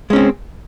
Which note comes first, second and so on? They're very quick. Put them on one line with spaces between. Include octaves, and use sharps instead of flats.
G#3 C#4 C4